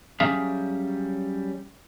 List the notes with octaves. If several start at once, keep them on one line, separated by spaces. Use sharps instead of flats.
F#3 G3 C#4 G#4 E5 F5